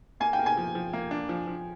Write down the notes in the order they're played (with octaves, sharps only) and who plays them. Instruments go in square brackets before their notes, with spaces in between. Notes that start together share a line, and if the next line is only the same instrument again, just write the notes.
[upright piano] A#3 [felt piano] G#5
[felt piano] G5
[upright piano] A#3
[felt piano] G#5
[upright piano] F3
F3
A#3
D4
F3
F3